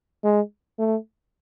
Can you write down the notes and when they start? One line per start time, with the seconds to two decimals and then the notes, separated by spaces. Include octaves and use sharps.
0.24 G#3
0.79 A3